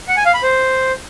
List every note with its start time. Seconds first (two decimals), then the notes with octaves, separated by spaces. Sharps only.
0.08 F#5
0.17 G#5
0.25 F5
0.34 B5
0.43 C5